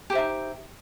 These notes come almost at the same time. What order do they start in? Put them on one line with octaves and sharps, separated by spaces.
G4 C5 E5 D#4